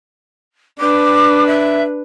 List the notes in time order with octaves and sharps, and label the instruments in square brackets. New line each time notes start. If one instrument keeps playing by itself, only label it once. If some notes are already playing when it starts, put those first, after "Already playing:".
[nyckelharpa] D4 B4 [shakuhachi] D6
[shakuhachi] E5